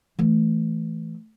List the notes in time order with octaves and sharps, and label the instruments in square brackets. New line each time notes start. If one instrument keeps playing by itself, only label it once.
[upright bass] E3 A3